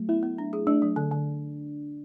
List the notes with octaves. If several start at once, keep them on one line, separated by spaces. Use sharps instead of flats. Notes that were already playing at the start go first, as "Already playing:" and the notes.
Already playing: F#3 A3
B3 E4
B3
D4
G#4
A3 D4
F#3
D3
D3